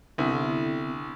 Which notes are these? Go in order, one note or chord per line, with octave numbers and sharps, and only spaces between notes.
C2 D3 B3 C4 E4